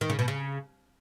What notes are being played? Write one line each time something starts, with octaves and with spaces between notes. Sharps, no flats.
D#3
C#3
B2
C#3